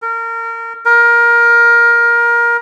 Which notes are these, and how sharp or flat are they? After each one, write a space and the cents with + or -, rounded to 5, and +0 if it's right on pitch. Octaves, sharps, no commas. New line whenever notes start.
A#4 -25
A#4 +20